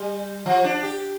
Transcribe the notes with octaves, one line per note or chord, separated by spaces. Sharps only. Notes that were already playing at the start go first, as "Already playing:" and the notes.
Already playing: G3
F3
D4
G4